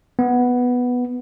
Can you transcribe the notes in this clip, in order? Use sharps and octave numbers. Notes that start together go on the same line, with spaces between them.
B3